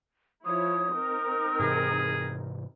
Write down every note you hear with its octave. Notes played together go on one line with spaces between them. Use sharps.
F3 E4 C#5 D#6
C4 D#4 A#4
G#2 C3 E3 G#4